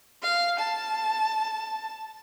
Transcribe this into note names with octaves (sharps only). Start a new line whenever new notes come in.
F5
A5